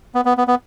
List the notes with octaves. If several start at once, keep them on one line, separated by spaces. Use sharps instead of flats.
B3
B3
B3
B3